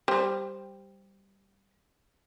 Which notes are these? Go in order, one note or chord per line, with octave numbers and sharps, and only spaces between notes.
G3 C5